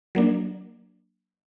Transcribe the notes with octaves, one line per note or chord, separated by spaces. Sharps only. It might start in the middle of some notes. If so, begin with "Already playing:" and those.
F#3 A#3 D4